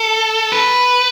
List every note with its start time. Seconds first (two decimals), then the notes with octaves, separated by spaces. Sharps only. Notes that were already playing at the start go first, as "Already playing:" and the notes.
Already playing: A4
0.52 B4